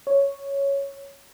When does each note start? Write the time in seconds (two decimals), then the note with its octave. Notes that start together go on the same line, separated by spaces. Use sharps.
0.07 C#5